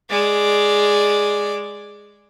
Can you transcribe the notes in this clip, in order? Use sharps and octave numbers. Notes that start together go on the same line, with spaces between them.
G#3 D5